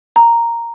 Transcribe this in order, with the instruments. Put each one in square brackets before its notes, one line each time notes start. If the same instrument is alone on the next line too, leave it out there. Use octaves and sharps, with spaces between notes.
[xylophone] A#5